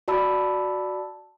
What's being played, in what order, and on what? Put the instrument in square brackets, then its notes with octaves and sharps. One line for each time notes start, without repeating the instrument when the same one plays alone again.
[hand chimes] F#4 D5 A5 B5 E6